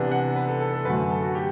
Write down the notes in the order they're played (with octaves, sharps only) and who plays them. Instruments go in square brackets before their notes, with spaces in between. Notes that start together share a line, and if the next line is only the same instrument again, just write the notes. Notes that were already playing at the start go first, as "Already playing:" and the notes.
Already playing: [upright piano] C3 E3 B3 D4 F#5
F#5
B4
A4
A4
A4
F#2 D3 F#3 A3 B4
A4
F#4
G4